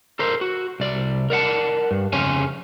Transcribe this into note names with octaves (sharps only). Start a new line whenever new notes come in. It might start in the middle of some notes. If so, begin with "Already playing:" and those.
A4 A#4 C5
F#4
C2 D5
A#4 D5 F#5 A5
G2
F2 C#3 C4 C#4 G#5